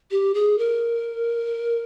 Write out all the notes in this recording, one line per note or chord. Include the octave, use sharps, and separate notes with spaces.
G4
G#4
A#4